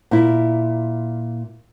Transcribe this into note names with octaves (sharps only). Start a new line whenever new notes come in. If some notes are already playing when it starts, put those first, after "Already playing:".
A#2 E4